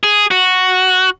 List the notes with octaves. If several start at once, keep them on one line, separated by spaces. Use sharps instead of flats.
G#4
F#4